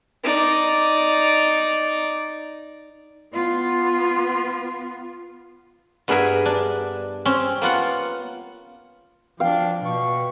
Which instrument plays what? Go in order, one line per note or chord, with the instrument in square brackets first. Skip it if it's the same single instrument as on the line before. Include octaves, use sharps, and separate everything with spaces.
[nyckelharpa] D#4 D5
[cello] B3 F4
[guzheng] G2 B3 G#4 A#4 E5 G#5
D4
C4 C#4
A#3 B3 F4 F#5
[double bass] F3 [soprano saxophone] D4 [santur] F5 G5
[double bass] B2 [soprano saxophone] C#6